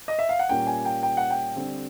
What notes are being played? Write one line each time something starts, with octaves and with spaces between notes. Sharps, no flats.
D#5
E5
F5
F#5
A#2 G3 A#3 C#4 G5
G#5
G5
G5
F#5
G5
D3 G3 C4